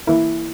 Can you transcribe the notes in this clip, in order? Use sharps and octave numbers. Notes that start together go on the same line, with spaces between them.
E3 A#3 E4 A#4